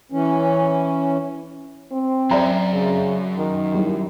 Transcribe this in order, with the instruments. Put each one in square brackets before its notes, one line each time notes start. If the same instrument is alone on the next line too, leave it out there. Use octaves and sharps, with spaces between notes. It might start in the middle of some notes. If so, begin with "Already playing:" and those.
[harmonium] E3 C#4
[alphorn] C4
[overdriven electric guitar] F#2 [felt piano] D5 E5 A#5
[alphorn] C#3
D#3
[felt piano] G3 E4